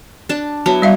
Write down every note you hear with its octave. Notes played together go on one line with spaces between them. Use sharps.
D4 A5
F#3 B3 E4 A5
G3 E5 F5